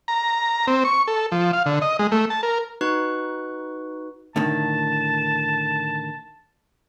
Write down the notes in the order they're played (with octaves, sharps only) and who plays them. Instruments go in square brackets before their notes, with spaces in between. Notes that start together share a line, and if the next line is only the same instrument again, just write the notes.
[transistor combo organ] A#5
C4
C#6
A4
F3
F5
D3
D#5
G#3
A3
A5
A#4
[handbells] D#4 F#4 B4 C#6 F#6
[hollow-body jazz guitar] A2 D3 D#3 [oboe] A5